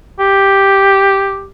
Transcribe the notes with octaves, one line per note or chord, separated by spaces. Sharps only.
G4